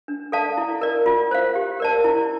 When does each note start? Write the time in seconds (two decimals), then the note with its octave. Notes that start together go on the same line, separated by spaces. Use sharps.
0.08 D4
0.32 A4 D5 F5 A5
0.58 E4
0.81 A#4 D5
1.06 F4
1.31 C5 F5
1.55 G4
1.80 A#4 D5 A5
2.04 E4